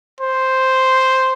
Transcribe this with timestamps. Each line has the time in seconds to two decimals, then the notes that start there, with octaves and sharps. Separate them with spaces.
0.20 C5